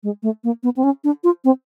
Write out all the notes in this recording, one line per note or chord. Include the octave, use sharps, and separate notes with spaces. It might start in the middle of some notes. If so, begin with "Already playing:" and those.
G#3
A3
A#3
B3
C4
C#4
D4
F4
C4